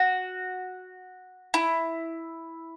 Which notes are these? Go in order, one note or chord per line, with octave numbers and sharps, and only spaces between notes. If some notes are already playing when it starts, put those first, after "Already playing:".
Already playing: F#4
E4